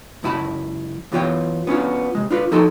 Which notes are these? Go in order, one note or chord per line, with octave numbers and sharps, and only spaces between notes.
C#2 F#2 E4 G#5 A5 B5
F#2 E3 B3 F4 C#5 G5
B3 C#4 D4 F4
C3 G#3
D4 F4 A#4 B4
F3 D#4 F#4 A4 G5 C6